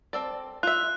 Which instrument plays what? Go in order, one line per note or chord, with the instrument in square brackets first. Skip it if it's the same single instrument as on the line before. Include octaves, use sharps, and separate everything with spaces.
[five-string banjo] C4 A4 D5
[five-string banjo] F4 E5 [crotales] F#6